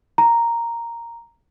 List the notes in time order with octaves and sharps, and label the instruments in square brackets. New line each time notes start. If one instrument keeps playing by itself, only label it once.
[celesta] A#5